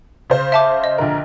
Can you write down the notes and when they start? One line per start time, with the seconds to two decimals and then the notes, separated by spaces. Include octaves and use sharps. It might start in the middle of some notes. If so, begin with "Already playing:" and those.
0.30 C#3 C5
0.52 E5 A5 D6
0.84 D#5
0.98 A#1 D3 A#4